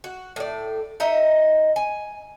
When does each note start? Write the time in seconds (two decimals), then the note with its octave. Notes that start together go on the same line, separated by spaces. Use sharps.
0.04 F#4
0.36 A2 D5
1.00 D#4 D#5 E5 A#5
1.76 G#5